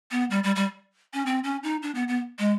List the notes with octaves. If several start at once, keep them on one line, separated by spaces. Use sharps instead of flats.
B3
G3
G3
G3
C#4
C4
C#4
D#4
D4
B3
B3
G#3